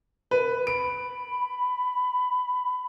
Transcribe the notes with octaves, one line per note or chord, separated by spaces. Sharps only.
A#4 B4
B5 D7